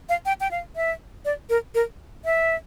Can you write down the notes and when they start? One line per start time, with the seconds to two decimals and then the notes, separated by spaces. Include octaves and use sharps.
0.09 F5
0.26 G5
0.41 G5
0.51 F5
0.76 E5
1.25 D5
1.50 A#4
1.75 A#4
2.25 E5